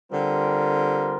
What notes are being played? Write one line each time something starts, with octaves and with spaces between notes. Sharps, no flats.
D3 G3 C4 F4 A#4